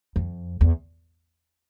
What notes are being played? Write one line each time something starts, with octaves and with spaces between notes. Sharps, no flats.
F2
E2